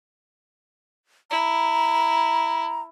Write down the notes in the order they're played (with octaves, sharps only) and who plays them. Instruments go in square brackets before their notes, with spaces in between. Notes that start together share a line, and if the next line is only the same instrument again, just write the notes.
[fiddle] E4 [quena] A#5